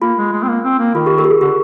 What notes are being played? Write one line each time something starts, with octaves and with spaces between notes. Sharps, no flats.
A#3 F4
G#3
G#3
C4
A#3
C4
A#3
D#3 F4
G4
A#4
G4
G#4
D3 G4